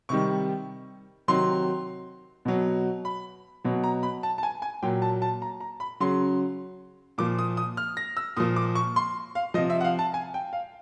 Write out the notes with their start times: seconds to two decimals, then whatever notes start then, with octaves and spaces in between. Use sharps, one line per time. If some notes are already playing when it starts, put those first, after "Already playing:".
0.09 C3 D#3 G3 C#6
1.28 C3 D#3 F#3 C6
2.45 B2 F#3
3.05 B5
3.64 B2 F#3
3.84 A#5
4.03 B5
4.23 A5
4.38 A5
4.43 G#5
4.62 G#5
4.82 A#2 F#3 G5
5.02 A5
5.22 A5
5.42 A#5
5.60 A#5
5.80 B5
6.00 C#3 F#3 C6
7.18 A#2 F3 D6
7.39 D#6
7.57 D#6
7.77 F6
7.97 A#6
8.17 E6
8.37 A#2 F3 D#6
8.56 D6
8.75 C#6
8.96 C6
9.35 F5
9.54 F3 D#5
9.58 C3
9.70 E5
9.81 F#5
9.84 F5
9.99 A5
10.14 G#5
10.34 G5
10.53 F5